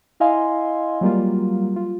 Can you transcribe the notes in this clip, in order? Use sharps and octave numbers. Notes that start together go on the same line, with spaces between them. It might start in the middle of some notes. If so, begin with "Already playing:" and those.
E4 D#5 F5 G#5 C6
F#3 G3 A#3 F4
F4